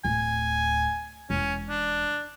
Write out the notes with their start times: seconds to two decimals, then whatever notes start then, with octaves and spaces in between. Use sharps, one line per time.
0.05 D1 G#5
1.30 E1 C#4
1.70 D4